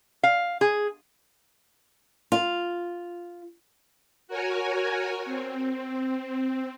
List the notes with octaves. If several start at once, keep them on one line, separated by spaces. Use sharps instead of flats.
F5
G#4
F4
F#4 A#4 C#5 G#5
C4